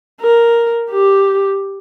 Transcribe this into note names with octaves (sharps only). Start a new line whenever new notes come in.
A#4
G4